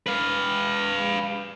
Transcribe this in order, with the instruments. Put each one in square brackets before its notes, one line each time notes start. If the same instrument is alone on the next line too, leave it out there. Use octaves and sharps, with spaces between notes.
[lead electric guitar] B4 F5